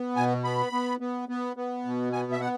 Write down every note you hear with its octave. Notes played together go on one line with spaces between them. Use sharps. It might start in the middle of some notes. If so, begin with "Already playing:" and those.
Already playing: B3
B2 G#5
B3 B5
B3
B3
B3
B3
B2
B3 G#5
E5
B3 F#5